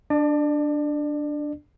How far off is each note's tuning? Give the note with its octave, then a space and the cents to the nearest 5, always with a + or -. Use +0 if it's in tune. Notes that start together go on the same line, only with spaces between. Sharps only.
D4 +0 D5 +35